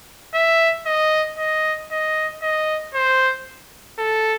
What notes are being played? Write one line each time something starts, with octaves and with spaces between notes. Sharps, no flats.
E5
D#5
D#5
D#5
D#5
C5
A4